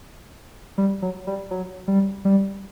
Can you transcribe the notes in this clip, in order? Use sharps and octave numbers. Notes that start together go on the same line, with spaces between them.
G3
F#3
G3
F#3
G3
G3